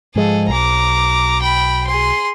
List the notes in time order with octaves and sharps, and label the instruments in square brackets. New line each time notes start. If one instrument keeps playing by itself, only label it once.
[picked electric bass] G#2 F3 G#3 [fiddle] G#4 A4
[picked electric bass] B1 [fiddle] A#5 D6
[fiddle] G5 B5
G#4 C6